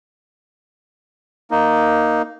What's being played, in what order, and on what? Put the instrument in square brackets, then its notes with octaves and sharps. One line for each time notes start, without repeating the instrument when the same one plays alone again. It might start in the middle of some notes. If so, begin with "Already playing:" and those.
[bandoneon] A#3 D#4